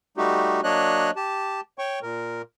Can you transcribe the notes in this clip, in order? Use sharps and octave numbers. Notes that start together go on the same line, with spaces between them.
G3 A3 D#4 F#4 G4
F#3 A#3 D4 C#5 D#5 F#6
G4 A5
C#5 G5 C#6
A#2 A#4